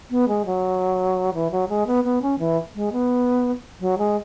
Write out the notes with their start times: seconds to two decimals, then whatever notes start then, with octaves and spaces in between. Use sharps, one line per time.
0.11 B3
0.28 G#3
0.46 F#3
1.34 E3
1.51 F#3
1.69 G#3
1.87 B3
2.04 B3
2.22 C#4
2.39 E3
2.75 G#3
2.92 B3
3.80 F#3
3.98 G#3